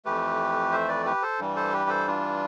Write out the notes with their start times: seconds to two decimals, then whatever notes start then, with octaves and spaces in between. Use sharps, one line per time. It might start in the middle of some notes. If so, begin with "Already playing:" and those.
0.05 F2 E3 A3 G4 B4
0.72 C5 E5
0.89 B4 D5
1.06 G4 B4
1.23 A4 C5
1.39 G2 E3 G3
1.56 A4 C5
1.73 G4 B4
1.89 A4 C5
2.07 D4 F4